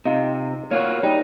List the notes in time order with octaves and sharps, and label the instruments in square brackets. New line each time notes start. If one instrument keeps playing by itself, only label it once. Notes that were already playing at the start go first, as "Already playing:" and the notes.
[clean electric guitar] C3 [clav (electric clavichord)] D#4 F4
[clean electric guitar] A#3 F4 F#4 [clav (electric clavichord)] C#5
[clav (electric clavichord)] G3 [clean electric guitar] D#4